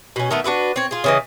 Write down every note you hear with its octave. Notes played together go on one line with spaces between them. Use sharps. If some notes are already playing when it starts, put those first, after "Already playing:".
B2 C#4
D#3 A3 B3
D4 F#4 B4 E5
C4 C#5
F4 G#4
C#3 E3 D#5